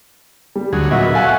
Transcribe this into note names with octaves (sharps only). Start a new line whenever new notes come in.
G3
D2 F#3 G#4
A#2 F#3 B3 F#4 D#5 E5
A4 F5 G#5 F#6